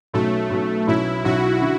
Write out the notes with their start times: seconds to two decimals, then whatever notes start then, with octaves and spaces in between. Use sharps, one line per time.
0.13 B1 B2 F#3 A3 C#4
0.51 B1 B2 F#3 C#4
0.87 B1 B2 F#3 C#4 E4
1.24 B1 B2 F#3 C#4 F#4
1.61 D3